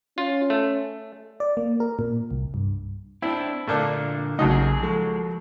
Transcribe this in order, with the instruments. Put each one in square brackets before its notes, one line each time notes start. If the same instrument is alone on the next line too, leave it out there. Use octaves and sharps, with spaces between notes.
[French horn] C#4 [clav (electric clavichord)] F4
[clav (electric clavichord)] A3
[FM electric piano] D5
A#3
A#4
A#2
C2
G2
[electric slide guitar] C4 D4 [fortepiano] E4
[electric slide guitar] A#2 D3 [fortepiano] A3 A#3 D4
[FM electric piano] A#1 C#3 D#4 [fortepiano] D#2 F#3 D#5 [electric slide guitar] A3
[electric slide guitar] G#4
[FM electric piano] F3 A4 C#6 [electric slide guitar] G#3